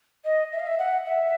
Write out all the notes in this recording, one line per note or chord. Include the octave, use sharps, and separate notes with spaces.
D#5
E5
F5
E5
F#5
E5